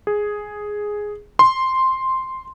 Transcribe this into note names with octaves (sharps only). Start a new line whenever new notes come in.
G#4
C6